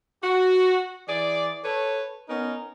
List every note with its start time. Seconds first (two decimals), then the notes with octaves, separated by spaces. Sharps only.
0.24 F#4
1.09 E3 G#4 D5
1.64 A4 B4 C#5
2.29 B3 C#4 D#4 A#4